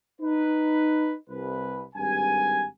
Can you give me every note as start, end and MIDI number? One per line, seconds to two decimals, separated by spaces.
0.21 1.14 63
0.21 1.14 71
1.29 1.83 36
1.29 1.83 71
1.96 2.65 32
1.96 2.65 43
1.96 2.65 67
1.96 2.65 80